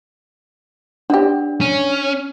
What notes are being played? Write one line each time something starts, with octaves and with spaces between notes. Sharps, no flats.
B3 D4 G4
C#4